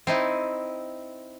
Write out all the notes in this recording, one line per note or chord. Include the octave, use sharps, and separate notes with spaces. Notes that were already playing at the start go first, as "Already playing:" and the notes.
C4 D#4 E4